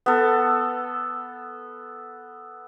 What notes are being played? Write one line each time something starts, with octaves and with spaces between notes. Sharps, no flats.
B3 A4